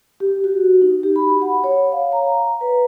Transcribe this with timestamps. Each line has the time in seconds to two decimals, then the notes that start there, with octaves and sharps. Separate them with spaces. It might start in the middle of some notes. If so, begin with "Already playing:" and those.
0.20 G4
0.44 F#4
0.82 D#4
1.03 G4
1.16 B5
1.42 F#5
1.64 C#5
1.92 F5
2.12 A#5
2.61 B4